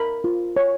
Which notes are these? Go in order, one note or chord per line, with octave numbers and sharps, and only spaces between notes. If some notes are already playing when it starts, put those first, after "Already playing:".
Already playing: A#4 B5
F4
C#5